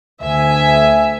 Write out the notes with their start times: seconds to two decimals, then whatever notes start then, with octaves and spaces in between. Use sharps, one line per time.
0.22 D2 E5 G#5